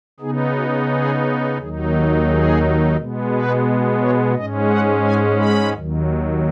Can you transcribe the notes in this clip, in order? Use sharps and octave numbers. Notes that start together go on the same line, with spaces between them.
C#3 B3 D#4 G#4
F#4
G#4
D#2 D#3 F#3 D#4 G#4
F#4
G#4
B2 G#3 B3
B4
C#5
G#2 G#3 C#4 D#5
F#5
G#5
B5
D#2 D#3 F#3